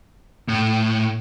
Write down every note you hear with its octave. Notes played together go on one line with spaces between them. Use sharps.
A2